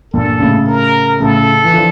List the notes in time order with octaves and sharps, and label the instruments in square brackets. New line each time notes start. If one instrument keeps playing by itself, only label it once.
[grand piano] G2 A#2 [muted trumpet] A4
[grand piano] A2 C#3
[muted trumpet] A#4
[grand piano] A2 C#3 [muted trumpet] A4
[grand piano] E3
D3 F3